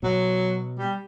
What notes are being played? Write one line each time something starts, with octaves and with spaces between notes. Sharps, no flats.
B2 F#3
G3